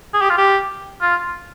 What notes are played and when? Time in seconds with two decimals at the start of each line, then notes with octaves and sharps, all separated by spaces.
0.14 G#4
0.21 G4
0.30 F4
0.38 G4
1.02 F4